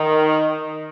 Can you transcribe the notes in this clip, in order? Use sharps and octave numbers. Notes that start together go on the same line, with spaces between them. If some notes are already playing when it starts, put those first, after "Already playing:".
Already playing: D#3